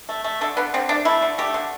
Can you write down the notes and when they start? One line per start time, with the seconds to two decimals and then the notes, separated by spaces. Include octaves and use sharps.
0.09 A3
0.24 A3
0.41 D3 A4
0.57 D3 B3
0.74 D3 C4
0.89 A3 D4
1.05 A3 E4
1.22 D3
1.38 A3 G4
1.54 D3